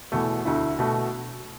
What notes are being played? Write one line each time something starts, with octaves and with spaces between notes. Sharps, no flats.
E2 B2 A3
D2 D3 A3 E4
B2 A3 F#4